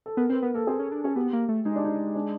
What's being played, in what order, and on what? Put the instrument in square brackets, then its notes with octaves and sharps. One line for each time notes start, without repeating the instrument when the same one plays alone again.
[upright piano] A4
[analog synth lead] B3 [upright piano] A#4
[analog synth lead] C4 [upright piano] B4
[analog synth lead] B3 [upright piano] A#4
[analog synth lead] A#3 [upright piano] A4
[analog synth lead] C4 [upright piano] G#4
[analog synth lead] C#4
D4
[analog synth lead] C#4 [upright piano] G#4
[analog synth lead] B3 [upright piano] G4
[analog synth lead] A#3
A3
[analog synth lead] G#3 [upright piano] D#4
[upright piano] D4
D#4
D4